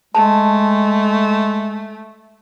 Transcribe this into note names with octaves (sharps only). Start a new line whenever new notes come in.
G#3 A3 A5